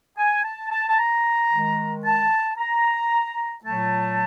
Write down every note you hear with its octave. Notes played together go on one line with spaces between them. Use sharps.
G#5
A5
A5
A5
A#5
D#3 G#3
A5
A#5
A#2 F#3 A3 A5